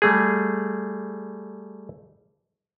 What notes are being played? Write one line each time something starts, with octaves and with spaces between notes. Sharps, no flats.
G3 A3 G#4